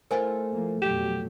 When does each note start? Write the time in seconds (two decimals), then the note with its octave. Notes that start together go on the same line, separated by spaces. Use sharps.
0.11 A3 E4 F4 A#4 C5 G#5
0.53 F3 A#3
0.82 F2 B2 F#3 G4 E7